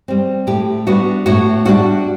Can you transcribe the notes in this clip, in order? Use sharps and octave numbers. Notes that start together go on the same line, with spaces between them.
G3 C4
A2 G4
G3 B3 D4 F#4
A2 F#4
G3 B3 D4 F#4